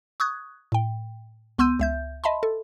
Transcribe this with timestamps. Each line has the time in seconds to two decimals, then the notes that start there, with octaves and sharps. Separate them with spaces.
0.20 C#6 D#6 F#6 G#6
0.72 A2 G5
1.58 C#2 B3 C6 E6 G6 D#7
1.80 C#2 E5 G6
2.24 D#5 E5 A5 B5 C6
2.43 A4